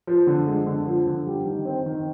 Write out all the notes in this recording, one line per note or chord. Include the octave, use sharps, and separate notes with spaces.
F3
D3
G#3
D3
F3
D3
G3
D#3
C4
D#3